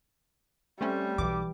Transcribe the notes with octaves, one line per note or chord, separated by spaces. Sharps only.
G3 A3 C4 C#4
B1 E3 D6